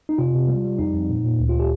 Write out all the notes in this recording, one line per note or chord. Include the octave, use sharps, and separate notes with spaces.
D#4
C3 F4
C3
G3
G3
F2 D#4
F2
A#2
A#2
D2
F4
G4